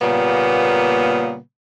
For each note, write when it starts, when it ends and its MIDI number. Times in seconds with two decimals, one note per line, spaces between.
0.02 1.38 46
0.02 1.38 49
0.02 1.38 55
0.02 1.38 58
0.02 1.38 59